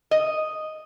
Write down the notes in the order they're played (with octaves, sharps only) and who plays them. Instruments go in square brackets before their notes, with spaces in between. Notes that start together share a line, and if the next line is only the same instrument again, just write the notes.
[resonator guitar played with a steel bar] D#5